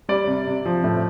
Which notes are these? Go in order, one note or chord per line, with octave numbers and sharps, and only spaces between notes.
G3 D5
C3
C3
F3
A2